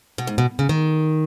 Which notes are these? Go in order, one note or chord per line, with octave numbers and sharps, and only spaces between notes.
B2
G#2
B2
C#3
D#3